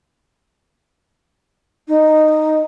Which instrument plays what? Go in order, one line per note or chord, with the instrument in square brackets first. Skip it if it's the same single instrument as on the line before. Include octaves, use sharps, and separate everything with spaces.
[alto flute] D#4